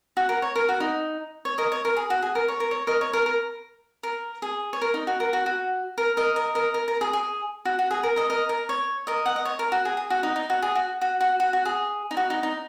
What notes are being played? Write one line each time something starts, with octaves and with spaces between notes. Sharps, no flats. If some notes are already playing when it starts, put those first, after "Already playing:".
F#4
A#4
C#5
A#4
F#4
D#4
C#5
A#4 D#5
C#5
A#4
G#4
F#4
G#4
A#4
C#5
A#4
C#5
A#4 D#5
C#5
A#4
A#4
A#4
G#4
C#5
A#4
D#4
F#4
A#4
F#4
F#4
A#4
A#4 D#5
A#4 D#5
A#4 D#5
A#4
A#4
G#4
G#4
F#4
F#4
G#4
A#4
A#4 D#5
A#4 D#5
A#4
C#5
A#4 D#5
F#5
D#5
C#5
A#4
F#4
G#4
G#4
F#4
D#4
D#4
F#4
G#4
F#4
F#4
F#4
F#4
F#4
G#4
D#4
F#4
D#4
D#4